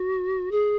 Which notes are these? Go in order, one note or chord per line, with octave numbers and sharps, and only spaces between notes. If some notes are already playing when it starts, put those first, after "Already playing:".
Already playing: F#4
G#4